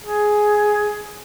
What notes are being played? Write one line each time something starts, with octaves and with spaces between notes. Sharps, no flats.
G#4